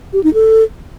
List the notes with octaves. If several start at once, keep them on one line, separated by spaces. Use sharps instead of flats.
G4
D#4
A4